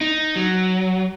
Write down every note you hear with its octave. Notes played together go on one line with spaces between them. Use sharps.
D#4
F#3